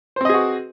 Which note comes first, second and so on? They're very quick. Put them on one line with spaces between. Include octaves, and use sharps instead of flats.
C5 C4 D#5 G#4 F#4